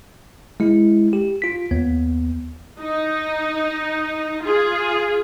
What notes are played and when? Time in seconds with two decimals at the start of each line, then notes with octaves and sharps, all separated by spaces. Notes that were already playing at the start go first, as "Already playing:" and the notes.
0.60 G#3 E4
1.13 G4
1.42 F4 B6
1.71 D#2 B3
2.80 D#4
4.42 F4 G#4